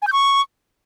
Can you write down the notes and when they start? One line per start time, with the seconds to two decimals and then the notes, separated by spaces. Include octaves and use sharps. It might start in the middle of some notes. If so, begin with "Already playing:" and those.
0.02 G#5
0.07 G6
0.13 C#6